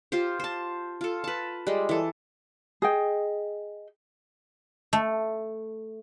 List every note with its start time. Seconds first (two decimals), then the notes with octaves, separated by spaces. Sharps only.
0.12 F4 G4 C5
0.40 C5 A5
1.01 F4 A4
1.24 B4 A5
1.67 G3 G#3
1.89 E3 A4
2.82 G#4 D#5 G5
4.93 A3